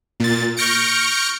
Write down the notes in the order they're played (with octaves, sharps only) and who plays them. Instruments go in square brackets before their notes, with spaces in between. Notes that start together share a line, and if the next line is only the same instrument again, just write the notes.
[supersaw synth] A#2 A6
C#6 F6 G6 A#6 C#7 D7